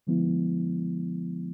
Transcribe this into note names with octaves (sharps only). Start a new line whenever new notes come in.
D3 F3 G#3 B3 E4